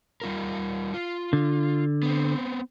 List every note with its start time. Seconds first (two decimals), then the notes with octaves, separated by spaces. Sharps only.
0.22 G3 F4 A#4
0.94 F4
1.33 D3
2.03 B3 C4